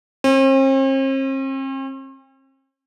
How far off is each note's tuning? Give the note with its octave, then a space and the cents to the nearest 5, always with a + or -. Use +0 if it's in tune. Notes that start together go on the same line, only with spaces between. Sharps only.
C4 +45